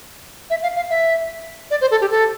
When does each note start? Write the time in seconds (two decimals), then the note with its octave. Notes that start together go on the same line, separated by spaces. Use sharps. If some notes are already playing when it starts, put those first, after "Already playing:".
0.50 E5
0.63 F5
0.76 F5
0.90 E5
1.71 D5
1.81 C5
1.91 A4
2.01 G4
2.11 A4